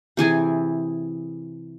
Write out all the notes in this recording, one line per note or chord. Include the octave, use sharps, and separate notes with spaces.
C3 E3 G#4 G#5